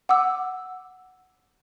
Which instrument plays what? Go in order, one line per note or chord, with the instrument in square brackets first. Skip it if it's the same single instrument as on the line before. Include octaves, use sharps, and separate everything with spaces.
[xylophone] F#5 D6 E6